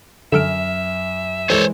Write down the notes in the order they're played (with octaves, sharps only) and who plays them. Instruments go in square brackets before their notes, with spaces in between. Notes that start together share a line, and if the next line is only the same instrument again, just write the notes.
[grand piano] F#2 F6 E7 [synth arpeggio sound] D3 A4 D7 [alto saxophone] E5
[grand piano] E3 G#3 E4 [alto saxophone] A4 [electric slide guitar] C5 C#5